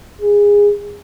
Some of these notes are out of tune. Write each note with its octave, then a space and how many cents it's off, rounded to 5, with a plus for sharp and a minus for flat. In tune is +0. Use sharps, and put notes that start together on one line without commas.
G#4 -20